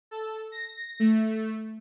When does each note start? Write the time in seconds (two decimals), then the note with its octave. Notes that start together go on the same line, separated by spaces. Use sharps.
0.11 A4
0.52 A#6
1.00 A3